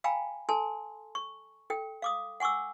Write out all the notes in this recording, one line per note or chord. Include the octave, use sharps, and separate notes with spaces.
F5 G5 G#5 A#5 B5
A4 G#5 A5 C6
C#6
A4 G5
F5 D6 D#6
F#5 G#5 C#6 D6 E6